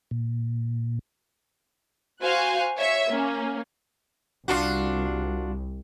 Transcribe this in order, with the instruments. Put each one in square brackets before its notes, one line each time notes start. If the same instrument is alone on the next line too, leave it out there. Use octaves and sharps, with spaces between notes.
[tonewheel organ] A#2
[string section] F#4 C5 F5 G#5 F#6
C#5 E5
A#3 C#4
[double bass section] C2 [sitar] D4 F4 F#4